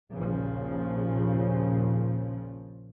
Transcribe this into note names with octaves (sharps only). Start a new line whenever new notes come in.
A#1 D#2 A#2 C#3 F3